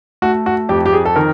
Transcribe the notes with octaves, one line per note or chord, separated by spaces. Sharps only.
A3 F#4
F#4
F2 G4
G4
G#4
A4
D#3 A#4